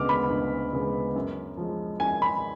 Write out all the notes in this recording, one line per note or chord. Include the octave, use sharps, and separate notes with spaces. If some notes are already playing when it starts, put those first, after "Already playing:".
Already playing: D2 C#3 G#3 B3 D6 F6
B5
D2
C#3 G#3 B3
F#2
F3 G#3
F#2 G#5
B5